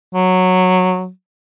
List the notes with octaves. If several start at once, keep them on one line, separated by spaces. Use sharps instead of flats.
F#3